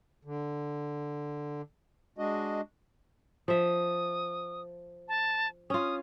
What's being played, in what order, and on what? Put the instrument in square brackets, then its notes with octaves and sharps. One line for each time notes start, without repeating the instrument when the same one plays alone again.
[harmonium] D3
G#3 D4 F#4 D#5
[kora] F3 E5 [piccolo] D#6
[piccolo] A5
[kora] C#4 F4 [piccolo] D#6